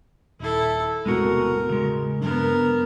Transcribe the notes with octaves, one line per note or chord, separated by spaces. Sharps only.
D#1 E4 A4
E1 A2 C3 G#3 B3 F#4 A#4
C#3 G#3
G2 F#3 B3 D4 A#4